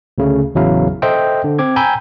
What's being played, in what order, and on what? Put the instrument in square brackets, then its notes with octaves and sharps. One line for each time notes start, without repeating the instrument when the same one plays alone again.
[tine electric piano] D2 C#3 A3
A1 E2 C#3 F#3 E4 F5
A4 C5 D#5 E5 G5
D3
C4 D6 G#6
G5 G#5 A#5 B5 E6 G6